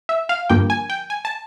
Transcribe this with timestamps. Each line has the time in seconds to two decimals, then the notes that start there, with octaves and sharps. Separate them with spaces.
0.09 E5
0.29 F5
0.49 G2 D3 F3 A#3 G5
0.70 G#5
0.90 G5
1.10 G#5
1.25 A5